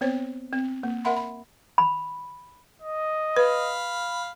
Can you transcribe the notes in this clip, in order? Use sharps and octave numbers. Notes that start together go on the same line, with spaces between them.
B3 C4 C5 C#5
C4
A#3
A#4 E5 F#5 B5 C6
B5
B5
D#5
B4 F5 B5